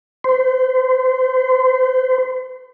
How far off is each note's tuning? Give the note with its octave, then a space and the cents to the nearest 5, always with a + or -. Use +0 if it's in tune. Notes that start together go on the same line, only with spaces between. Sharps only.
C5 -30